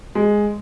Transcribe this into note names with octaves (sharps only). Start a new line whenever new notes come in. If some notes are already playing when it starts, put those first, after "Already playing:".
G#3